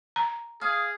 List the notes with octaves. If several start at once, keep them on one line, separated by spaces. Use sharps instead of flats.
A#5
G#4 F5 D#6